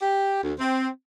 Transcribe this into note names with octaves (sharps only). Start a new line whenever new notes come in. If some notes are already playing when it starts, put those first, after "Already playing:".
G4
D2
C4